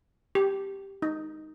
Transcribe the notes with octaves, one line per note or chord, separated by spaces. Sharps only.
G4
D#4